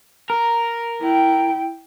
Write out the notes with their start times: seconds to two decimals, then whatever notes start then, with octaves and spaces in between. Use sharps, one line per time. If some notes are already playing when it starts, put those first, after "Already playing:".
0.30 A#4
1.00 E4 G5